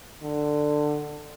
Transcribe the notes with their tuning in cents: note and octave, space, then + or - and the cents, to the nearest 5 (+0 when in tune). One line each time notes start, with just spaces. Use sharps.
D3 +15